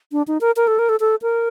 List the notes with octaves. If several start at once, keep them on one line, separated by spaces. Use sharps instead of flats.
D4
D#4
A#4
A#4
A4
A#4
A4
A4
A#4